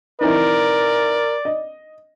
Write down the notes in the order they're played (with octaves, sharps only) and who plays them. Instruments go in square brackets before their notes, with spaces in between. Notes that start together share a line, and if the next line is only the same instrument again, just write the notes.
[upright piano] E3 C4 D#4 [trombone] A#4 [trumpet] D5
[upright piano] D#5